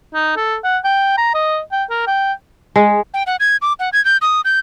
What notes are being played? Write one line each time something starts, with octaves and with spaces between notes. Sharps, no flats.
D#4
A4
F#5
G5
A#5
D#5
G5
A#4
G5
G#3
G5
F#5
G#6
D6
F#5
G#6
G6
D#6
G6